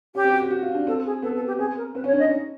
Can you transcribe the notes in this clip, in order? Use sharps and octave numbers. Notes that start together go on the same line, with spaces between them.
C#4 G4
C4
F#4
G4
F#4
F4
D4
C4 A4
G#4
B3 A4
A4
G4
C4 G#4
A#4
C4 B4
C#4
C#5
D4
D#5
D#4